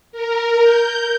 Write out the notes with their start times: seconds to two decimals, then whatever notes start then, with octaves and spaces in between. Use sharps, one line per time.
0.12 A#4
0.62 G6